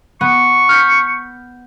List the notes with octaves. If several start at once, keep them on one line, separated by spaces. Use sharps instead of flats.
B3 C#6
F6 G6 B6